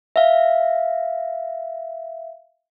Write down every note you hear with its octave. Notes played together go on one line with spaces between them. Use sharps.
E5 F5